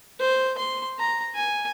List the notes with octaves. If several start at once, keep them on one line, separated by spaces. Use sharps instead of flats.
C5
C6
A#5
G#5